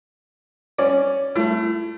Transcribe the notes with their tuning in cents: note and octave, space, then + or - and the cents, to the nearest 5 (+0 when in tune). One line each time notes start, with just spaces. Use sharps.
C#4 +0 D5 +0
A3 +0 E4 +40